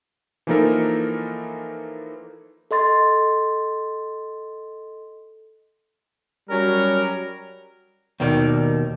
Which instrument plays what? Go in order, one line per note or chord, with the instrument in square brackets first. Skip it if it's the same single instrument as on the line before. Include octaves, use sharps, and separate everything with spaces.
[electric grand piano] E3 F3 A#3 D#4 A4 A#4
[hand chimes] A4 D#5 C6 A6
[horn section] F#3 G3 C#4 A#4
[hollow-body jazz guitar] D#2 B2 D#3 D#4 D5